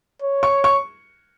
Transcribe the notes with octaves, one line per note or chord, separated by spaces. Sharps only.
C#5
C#6
C#6